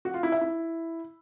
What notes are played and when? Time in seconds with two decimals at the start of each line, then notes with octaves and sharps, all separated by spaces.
0.05 F#4
0.14 F4
0.23 E4
0.32 E5
0.41 E4